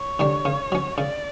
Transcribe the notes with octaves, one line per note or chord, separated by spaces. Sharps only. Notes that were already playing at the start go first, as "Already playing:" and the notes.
Already playing: C#5
D3 G3 D4
C#3
F#3 C#4
C#3 D5